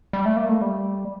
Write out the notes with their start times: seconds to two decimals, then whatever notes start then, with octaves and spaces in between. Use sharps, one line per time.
0.13 G3
0.26 A3
0.37 A#3
0.49 A3
0.61 G3